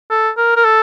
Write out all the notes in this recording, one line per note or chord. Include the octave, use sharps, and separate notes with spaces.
A4
A#4
A#4
A4